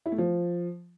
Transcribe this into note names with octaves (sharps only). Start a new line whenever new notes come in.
E4
A3
F3